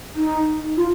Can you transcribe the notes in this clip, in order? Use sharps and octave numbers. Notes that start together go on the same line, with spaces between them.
D#4
F4